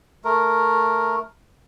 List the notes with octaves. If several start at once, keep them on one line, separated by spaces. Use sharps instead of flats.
A3 A#4